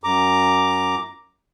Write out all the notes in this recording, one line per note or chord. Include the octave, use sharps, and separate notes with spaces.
F#2 A#5 D6